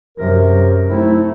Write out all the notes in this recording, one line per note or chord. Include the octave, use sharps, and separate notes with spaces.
F#2 C3 A#4
A3 C4 D#4 E4